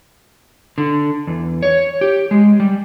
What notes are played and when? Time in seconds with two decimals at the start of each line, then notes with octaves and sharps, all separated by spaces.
0.78 D3
1.27 E2
1.62 C#5
2.01 G4
2.31 G#3
2.60 G3